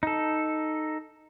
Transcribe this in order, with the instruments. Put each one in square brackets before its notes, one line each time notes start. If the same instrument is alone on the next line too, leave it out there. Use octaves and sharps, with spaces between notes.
[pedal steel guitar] D#4 A4